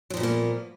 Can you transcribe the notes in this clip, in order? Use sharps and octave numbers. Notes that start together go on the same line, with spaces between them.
A#2 F3 F#3 A#3 B3